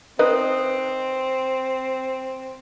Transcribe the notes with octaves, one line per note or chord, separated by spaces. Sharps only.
C4 D#4 B4 D#5